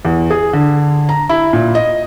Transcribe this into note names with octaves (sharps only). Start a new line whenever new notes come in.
E2
G#4
D3
A#5
E4
A#2
D#5